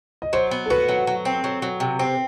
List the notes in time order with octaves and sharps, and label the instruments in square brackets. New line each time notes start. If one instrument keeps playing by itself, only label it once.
[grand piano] D#5
[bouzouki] F#3 [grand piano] C5
[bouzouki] B3
[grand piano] A4
[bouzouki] F#4 [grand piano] B4
[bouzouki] F#3
F#3
C4
F#3
F#3
C3
C4